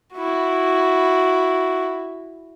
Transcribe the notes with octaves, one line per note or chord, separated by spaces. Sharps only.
E4 F#4